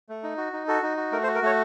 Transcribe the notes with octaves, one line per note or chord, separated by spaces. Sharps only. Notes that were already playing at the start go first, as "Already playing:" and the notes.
A3
D#4
F#4
D#4
F#4 A4
D#4
F#4
A3 A#4
C5
F#4
A#4
A3 C#5